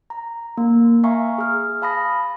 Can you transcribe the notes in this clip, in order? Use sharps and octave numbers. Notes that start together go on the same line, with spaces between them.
A#5
A#3
E5 F5 G#5 A#5 C#6
G#4 F6
F5 A5 B5 D#6 A#6